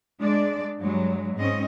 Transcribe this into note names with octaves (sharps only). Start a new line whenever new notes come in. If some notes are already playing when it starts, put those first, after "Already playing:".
G#3 D4 D5
G2 F#3 G#3
G#2 C4 C#4 D#5